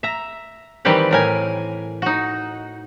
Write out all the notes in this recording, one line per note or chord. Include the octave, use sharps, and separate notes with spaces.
E5 A#5
D#3 E3 G3 C4 G4 B4
A2 A#4 G#5
D#4 F#4